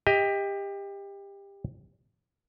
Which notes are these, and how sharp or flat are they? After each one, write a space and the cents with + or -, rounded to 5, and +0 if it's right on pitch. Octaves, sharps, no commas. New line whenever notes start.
G4 +25 D#5 +25